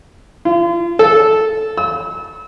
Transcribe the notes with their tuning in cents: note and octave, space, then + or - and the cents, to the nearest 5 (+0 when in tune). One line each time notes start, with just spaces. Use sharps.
F4 -40
A4 -10
E6 -30